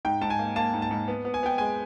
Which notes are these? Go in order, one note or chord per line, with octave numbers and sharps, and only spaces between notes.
G#2 G5
G#2 A5
G#5
A#3
A#3 A5
G#2
A5
G#2
B3
B3
G#5
B3 G5
G#3 G#5